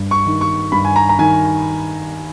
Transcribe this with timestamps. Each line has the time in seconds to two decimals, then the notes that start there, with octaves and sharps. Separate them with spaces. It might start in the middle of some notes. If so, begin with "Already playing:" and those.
Already playing: G2
0.11 C#6
0.26 D#3
0.41 C#6
0.72 G2 B5
0.85 G#5
0.96 A#5
1.09 A#5
1.19 D#3 G#5